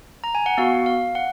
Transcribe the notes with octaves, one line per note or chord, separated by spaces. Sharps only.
A#5
G#5
F#5
B3 F#4 F5
F5
F#5